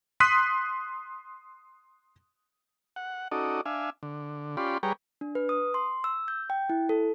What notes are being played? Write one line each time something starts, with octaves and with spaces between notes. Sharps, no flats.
C6 D#6 F#6 B6 D#7
F#5
C#4 D#4 F#4 A4 D5 D#5
D4 E5 F5 G#5
D3
C#4 F4 G4 D5 B5 C6
G3 G#4 B4 C#5 G5 A#5
D4
B4
D#6
C6
E6
G6
G5
E4
A4